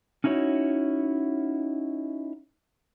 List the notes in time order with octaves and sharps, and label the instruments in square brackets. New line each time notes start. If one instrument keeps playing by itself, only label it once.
[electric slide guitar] C#4 D#4 E4 F#4 C#5